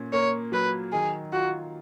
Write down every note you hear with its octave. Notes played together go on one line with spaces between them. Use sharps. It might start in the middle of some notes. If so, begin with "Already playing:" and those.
Already playing: A#2 C#4
A#3 C#5
F#3 B4
D#3 G#4
F4 F#4